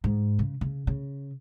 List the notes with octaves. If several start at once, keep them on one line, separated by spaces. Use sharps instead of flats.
G#2
C#3
C#3
C#3